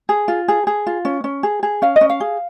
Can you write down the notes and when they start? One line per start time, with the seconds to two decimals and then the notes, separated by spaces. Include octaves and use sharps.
0.09 G#4
0.28 F4
0.48 G#4
0.67 G#4
0.87 F4
1.05 C#4
1.24 C#4
1.43 G#4
1.63 G#4
1.82 C#4 F5
1.96 D#5
2.01 C#4
2.10 F5
2.20 G#4